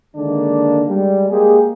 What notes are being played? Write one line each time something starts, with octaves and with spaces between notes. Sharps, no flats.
D3 D#3 G#3 A#3 D4 D#4
G3 G#3
G#3 A#3 G4 G#4